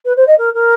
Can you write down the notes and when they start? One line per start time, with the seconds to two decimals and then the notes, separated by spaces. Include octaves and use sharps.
0.05 B4
0.16 C5
0.27 D#5
0.38 A#4
0.54 A#4